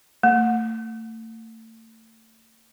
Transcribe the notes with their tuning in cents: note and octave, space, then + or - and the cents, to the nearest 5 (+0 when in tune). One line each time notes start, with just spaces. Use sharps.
A3 +35